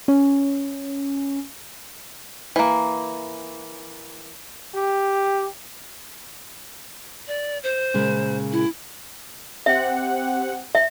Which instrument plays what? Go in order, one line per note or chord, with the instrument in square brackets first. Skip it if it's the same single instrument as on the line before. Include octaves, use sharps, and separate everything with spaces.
[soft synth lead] C#4
[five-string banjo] E3 A#3
[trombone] G4
[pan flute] D5
C5
[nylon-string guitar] A#2 C#3 G#3
[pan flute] E4
[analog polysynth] C4 G4 F#5 [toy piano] E5
[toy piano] E5